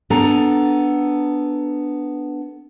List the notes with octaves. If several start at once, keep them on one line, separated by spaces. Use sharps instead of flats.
B3 D4 A4 G#5 A#5